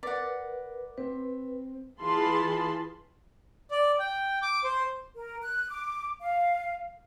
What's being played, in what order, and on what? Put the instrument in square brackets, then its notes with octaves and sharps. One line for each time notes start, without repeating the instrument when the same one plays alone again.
[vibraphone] A#4 B4 [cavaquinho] D5 F#5
[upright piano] C4 [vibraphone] B4
[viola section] E3 F4 G#4 A5 B5 C6
[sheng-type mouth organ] D5
G5
D6
C5
[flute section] A#4
F#6
D6
F5